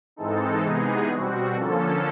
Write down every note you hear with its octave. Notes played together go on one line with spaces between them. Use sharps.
G#2 E3 G#3 C4 D#4 A4
C3 E3 G#3 B3 D#4 G#4
B2 G3 C4 F#4
D3 F3 A#3 C#4 A4